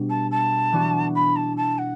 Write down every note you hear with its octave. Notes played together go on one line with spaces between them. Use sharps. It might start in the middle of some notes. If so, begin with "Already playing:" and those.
Already playing: B2 G3 D4 F#4
A5
A5
E3 B3 D4 F#4
B5
A5
A5
F#5